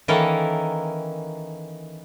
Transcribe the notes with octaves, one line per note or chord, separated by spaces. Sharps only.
D#3 E3 A#3 C#4 A4 A#4